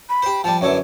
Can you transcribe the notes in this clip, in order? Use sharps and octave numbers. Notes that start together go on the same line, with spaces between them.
B5
G4 C5
F3 G3 A5
F#2 D3 E3 C#5